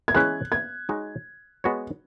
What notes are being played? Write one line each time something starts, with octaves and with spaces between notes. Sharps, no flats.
G#6
E3 G#3 C#4 E4 G#4 F#6
G#6
G#3 D#4 F#4 C#5
G#3 B3 F#4 C#5